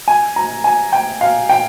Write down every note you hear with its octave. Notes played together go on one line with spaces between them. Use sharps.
G#5
A#5
G#5
G5
F5
G5